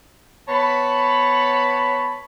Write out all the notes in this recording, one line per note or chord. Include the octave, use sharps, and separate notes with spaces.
B3 C#5 A5 B5